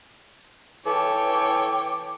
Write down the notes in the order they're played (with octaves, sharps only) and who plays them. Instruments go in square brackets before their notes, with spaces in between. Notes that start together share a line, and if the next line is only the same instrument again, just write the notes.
[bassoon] E3 [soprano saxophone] A4 [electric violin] C#5 G5 [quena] D6